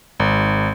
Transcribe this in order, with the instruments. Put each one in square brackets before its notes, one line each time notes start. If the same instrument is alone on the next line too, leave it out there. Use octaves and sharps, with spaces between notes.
[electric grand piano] G#1